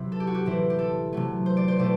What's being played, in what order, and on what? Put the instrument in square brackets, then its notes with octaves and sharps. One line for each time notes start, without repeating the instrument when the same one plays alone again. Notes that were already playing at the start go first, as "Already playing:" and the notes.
Already playing: [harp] C3 F#3 C4 E4
A4
G4
F#4
G4
A2 E3 G3 C4 E4
G4
A4
C3 F#3 A3
C5
D5
C5
B2 A3 E4 D5